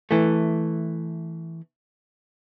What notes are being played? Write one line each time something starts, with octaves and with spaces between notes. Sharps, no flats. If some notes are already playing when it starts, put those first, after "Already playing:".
E3 A3